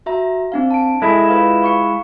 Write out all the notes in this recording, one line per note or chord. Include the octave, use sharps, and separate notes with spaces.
F#4 E5 A#5
C4 D4 F5
A5 D7
G#3 E4 A4 E5 G#6
F4 B4 F5
F5 C#6 C#7